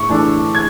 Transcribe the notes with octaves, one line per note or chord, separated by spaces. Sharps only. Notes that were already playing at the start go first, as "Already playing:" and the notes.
Already playing: A2 C#6
E3 A3 D4
G#6